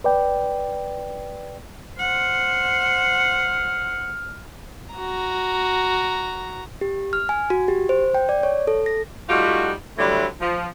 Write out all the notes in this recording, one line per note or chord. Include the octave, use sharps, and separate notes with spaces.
B4 D5 G5
C5 F#5 F6
F#4 A#5
G4
F6
G#5
F#4
G4
C5
G5
D5
C#5
A4
A#6
G3 A3 D#4 F4 F#4
D3 F#3 G3 A3 E4
F3